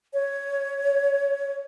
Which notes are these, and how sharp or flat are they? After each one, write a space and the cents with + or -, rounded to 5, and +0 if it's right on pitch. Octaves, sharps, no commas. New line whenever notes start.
C#5 +10